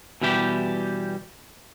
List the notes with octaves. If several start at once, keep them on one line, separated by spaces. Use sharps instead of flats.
B2 E3 G3 E4 G4